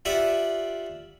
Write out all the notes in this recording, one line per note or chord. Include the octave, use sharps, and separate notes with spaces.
F4 G4 D5 E5 F#5